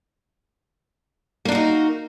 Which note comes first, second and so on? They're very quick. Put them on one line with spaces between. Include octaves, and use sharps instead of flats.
A#3 D4 F#4 D#4